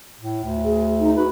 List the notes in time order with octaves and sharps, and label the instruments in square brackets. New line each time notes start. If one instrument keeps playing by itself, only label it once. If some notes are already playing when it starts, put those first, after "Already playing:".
[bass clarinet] A2
D2
[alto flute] G#4
D#4
[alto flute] F#4 [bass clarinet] B4